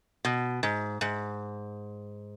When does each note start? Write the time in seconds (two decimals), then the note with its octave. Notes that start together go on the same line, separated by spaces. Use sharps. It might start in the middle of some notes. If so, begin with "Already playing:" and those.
0.25 B2
0.63 G#2
1.01 G#2